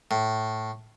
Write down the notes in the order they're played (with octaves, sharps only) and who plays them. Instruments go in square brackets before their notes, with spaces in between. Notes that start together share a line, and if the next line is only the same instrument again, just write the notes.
[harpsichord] A2